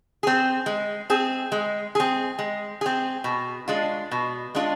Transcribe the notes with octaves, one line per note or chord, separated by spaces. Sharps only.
C4 G#4
G#3
C4 G#4
G#3
C4 G#4
G#3
C4 G#4
B2
G#3 D4 F4
B2
G#3 D4 F4